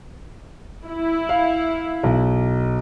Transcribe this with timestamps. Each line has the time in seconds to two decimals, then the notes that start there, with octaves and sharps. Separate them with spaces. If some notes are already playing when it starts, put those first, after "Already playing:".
0.86 E4
1.29 F5
2.03 B1